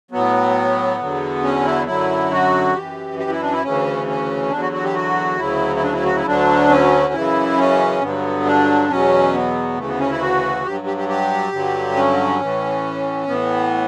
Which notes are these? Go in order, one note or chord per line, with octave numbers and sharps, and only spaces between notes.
A2 F#3 B3
E2 D3 F#3
C#4
E4
F#2 D3 F#3 E4
F#4
F#2 E3 G4
G4
E4
D4
E4
D2 C#3 E3 C#4
C#4
E2 D3 F#3 D4
F#4
F#4
G4
F#4
D2 C#3 F#3 E4
E4
D4
E4
F#4
E4
D2 D3 F#3 D4
C#4
F#2 C#3 E3 E4
C#4
G2 D3 F#3 B3
D4
E2 B2 F#3 C#4
B3
D2 C#3 E3 A3
B3
C#4
E4
F#4
G2 F#3 G4
G4
G4
G4
G2 D3 F#3
C#4
A2 E3
A2 E3 B3